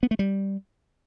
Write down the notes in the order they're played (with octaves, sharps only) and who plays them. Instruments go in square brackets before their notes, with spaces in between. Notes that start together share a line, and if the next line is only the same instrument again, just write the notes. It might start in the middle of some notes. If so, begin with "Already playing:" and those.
[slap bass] B3
A3
G3